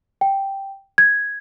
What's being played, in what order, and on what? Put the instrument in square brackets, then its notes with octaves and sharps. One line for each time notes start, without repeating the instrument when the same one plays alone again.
[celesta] G5
G#6